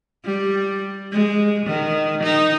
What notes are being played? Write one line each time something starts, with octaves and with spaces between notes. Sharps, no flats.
G3
G#3
D#3
D#4